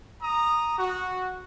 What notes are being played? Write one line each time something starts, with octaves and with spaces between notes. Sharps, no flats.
A#5 D#6
F#4